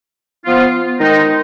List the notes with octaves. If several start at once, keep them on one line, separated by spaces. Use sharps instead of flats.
F3 B3 F4
D#3 G#3 D#4